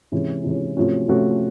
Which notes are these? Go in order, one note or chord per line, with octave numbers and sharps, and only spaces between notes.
C3 E3 G#3 C#4
C3 E3 G#3 C#4
C3 F3 A3 C#4 F#4
C3 F3 A3 C#4 F#4